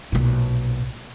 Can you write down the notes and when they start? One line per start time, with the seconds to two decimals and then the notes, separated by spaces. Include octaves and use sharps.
0.12 B1 A#2